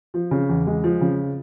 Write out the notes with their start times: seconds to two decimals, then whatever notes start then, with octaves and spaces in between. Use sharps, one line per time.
0.14 F3
0.31 C#3
0.49 E2
0.67 G#3
0.84 F3
1.01 C#3